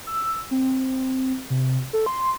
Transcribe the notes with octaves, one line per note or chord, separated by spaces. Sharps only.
E6
C4
C3
A4
C6